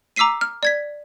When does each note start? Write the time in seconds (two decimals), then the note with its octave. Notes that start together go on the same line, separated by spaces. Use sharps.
0.16 A#5 D6 E6 B6 C7 D#7
0.41 F6
0.63 D5 G#6 B6